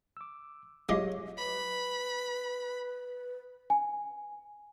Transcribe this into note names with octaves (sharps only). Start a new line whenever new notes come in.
D6 E6
F#3 G#3 F4 G4 C#5 D#5 D6
B4 B5
G#5